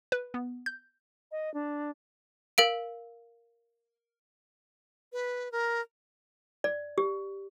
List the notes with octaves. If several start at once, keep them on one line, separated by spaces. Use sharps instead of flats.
B4
B3
G6
D#5
D4
A#4 F5 D7
B4
A#4
D5
G4